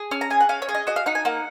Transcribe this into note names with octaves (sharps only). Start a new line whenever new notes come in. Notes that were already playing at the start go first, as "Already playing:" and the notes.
Already playing: G#4
C#4 F6
A#5
G#4 G#5
F#5
C#4 F5
C#5
G#4
D#5
F#4 D#5
F5
D#4 F#5
G#5
A#3 F#5